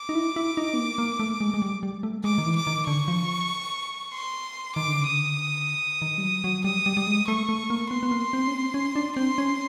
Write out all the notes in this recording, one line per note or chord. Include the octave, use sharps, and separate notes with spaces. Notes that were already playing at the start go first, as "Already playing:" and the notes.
Already playing: D6
D#4
E4
E4
D#4
B3
A#3
A#3
A3
G#3
G#3
G3
G3
A3
G#3 D6
D#3
E3
D6
D#3
D3 C#6
F3
C6
D#3 D6
D3
C#3
D3 D#6
D#3
G3
F#3
F#3
G3 D#6
G3
G3
G#3
A3 C#6
A3
A#3
B3 C6
B3
A#3
C4
C#4
C4
C#4
D4
C4 C6
C#4